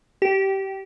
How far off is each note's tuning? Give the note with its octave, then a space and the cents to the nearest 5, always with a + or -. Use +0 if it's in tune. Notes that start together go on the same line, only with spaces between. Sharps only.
G4 -20